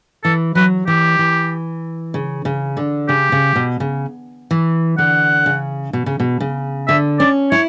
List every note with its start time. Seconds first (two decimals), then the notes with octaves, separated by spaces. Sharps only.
0.24 E3 A4
0.55 F#3 B4
0.87 E3 G4
1.19 E3
2.14 C#3
2.45 C#3
2.77 D3
3.09 C#3 G4
3.32 C#3
3.56 B2
3.80 C#3
4.51 E3
4.98 D3 F#5
5.46 C#3
5.93 B2
6.06 C#3
6.20 B2
6.40 C#3
6.88 D3 E5
7.20 C#4 D5
7.51 E4 C#5